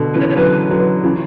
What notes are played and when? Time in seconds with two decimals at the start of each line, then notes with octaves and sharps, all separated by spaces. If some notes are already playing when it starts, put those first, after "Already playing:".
Already playing: B2 D3
0.14 C#3 E3 B4
0.20 C#5
0.30 C#5
0.36 D3 F#3 B4
0.70 D3 F#3
1.04 C#3 E3